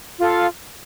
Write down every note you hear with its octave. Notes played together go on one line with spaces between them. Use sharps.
F4 A4 F5